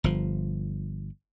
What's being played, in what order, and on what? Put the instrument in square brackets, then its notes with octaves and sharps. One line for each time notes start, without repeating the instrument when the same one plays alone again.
[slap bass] G1 F3